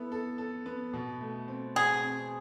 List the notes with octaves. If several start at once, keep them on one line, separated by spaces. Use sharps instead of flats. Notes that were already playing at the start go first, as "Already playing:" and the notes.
Already playing: B3 E4 A4
A4
A4
B3
B2
A3
C4
B2 G#4
C4